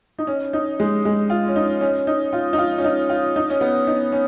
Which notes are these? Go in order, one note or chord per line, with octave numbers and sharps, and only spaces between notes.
D#4
C#4
D#4
G#3
G#3
F4
C#4
D#4
C#4
D#4
F4
D#4
F4
C#4
D#4
F4
D#4
C#4
B3
D#4
C#4